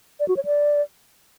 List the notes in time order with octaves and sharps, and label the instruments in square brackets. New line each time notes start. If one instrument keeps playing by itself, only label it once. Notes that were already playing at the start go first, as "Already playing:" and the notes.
[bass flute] D5
F#4
C#5
D5